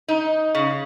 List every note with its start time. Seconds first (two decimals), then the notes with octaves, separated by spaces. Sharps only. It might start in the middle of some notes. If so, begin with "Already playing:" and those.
0.08 D#4
0.55 C#3